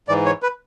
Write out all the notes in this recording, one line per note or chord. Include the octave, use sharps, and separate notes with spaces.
G#2 E3 D5
C#5
B4